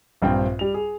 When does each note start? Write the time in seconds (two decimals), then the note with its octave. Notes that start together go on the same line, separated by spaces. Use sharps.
0.22 A#1 G2 C4 G5
0.59 G3 F7
0.74 G#4